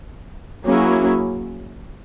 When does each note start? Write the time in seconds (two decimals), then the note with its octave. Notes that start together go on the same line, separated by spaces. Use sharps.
0.65 F#3 A#3 C#4 E4 G#4